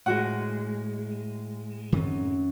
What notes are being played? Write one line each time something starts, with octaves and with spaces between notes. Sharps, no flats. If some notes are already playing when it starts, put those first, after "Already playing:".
A2 G#3 F#4 F#5
F#2 D#3 C4